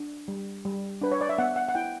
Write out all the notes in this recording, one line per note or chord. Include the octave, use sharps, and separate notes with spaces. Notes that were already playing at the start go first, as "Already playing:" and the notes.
Already playing: D4
G3
G3
D4 B4
C#5
D5
E5
B3 F#5
F#5
F#5
E4 G5